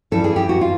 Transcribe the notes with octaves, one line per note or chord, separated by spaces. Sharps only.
G2 E3 G3 A4
G#4
G4
F#4
F4